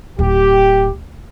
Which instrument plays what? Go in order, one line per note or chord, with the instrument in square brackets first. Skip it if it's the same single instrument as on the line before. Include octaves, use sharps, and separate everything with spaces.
[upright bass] D1 [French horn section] G4